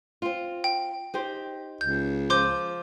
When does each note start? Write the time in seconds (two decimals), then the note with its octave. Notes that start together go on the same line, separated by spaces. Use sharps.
0.22 C4 F4
0.64 G5
1.14 D#4 G4 C5
1.81 C#2 G6
2.30 F3 C6 D6 G6